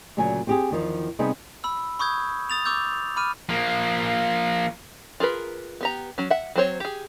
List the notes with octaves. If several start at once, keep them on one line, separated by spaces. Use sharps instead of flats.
D2 A#2 C#3 F#3 G#5
C4 G4 G#4
E2 D#3 F3
C3 G3 B3 D#4 G#4 C5
B5 E6
B5 C#6 D#6 G6 G#6
D#6 A6 F7
C#6 D6 E6 G6
B5 D6 F6 D#7
F3 A#3
F4 G#4 A#4 B4
B3 G4 A#5
F#3 C#4
E5 F#5
F#3 C4 C5 C#5
G4 G#4